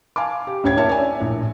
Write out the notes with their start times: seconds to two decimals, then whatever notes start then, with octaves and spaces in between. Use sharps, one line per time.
0.16 F5 G#5 A5 D6
0.47 G4
0.63 A1 D2 D3 C#5 G5 G#6
0.77 A#3 E4 C#5 E5 A5
0.89 C#5 D5 E5 G#5
1.20 A#1 A2